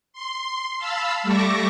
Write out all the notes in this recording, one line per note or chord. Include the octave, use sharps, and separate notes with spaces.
C6
F5 A5 B5 E6
G3 A3 E5 C#6 D6 A#6